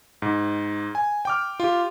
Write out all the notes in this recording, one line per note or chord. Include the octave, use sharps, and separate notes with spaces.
G#2
G#5
G5 D6 F6
F4 G4